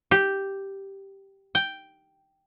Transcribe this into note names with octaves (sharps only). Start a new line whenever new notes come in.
G4
G5